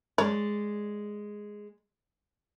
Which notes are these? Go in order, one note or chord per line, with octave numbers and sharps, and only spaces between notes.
G#3 C#5 D5